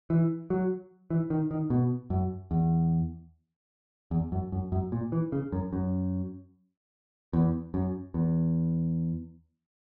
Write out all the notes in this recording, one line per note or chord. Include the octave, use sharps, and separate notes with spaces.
E3
F#3
E3
D#3
D#3
B2
F#2
E2
E2
F#2
F#2
F#2
A#2
E3
C#3
F#2
F#2
E2
F#2
E2